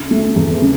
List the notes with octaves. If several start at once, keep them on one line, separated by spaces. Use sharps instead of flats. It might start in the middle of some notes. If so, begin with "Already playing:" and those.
Already playing: D2 C#3
A3
E2
C#3